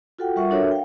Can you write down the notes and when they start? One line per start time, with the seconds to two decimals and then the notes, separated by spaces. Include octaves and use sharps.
0.19 F4 F#4 A4 F#5 G5
0.36 G3 F4 A#4 E5 F#5 C#6
0.51 D4 F#4 A4 A#4 C#5 E5
0.71 F5 G5